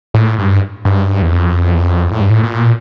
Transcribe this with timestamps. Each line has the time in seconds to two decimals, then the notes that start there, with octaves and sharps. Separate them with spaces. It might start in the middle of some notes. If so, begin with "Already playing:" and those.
0.14 A2
0.39 G2
0.85 G2
1.22 E2
1.32 F2
1.74 E2
1.80 F2
2.12 A2
2.21 G2
2.30 A2
2.43 A#2